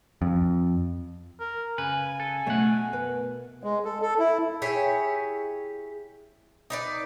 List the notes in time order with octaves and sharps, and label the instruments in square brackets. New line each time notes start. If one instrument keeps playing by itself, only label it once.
[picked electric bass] F2
[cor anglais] A#4
[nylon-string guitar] C#3 [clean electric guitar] B4 [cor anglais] G#5
[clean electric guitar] A4
[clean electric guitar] B2 F#5 [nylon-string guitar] A3 C#5 D#5
[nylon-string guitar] A#4 B4
[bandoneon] G#3
A4
A4
E4
[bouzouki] E4 G4 G#4 C#5
D#4 B4 D5